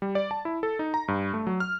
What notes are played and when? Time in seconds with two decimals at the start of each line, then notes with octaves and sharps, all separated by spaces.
0.02 G3
0.15 D5
0.31 A5
0.45 E4
0.63 A4
0.79 D#4
0.94 A#5
1.08 G2
1.34 A3
1.47 F#3
1.60 F6